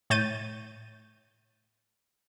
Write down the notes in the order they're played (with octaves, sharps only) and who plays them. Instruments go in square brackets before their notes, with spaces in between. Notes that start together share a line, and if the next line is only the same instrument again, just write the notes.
[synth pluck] A2 C#5 G6 A6 D#7